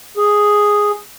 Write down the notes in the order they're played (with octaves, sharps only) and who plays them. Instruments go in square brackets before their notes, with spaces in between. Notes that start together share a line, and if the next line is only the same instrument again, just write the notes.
[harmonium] G#4